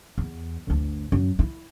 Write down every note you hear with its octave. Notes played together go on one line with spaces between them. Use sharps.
E2
G1 D2
F#2
E4